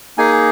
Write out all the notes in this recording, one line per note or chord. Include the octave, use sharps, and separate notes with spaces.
A#3 D#4 G#4 G#5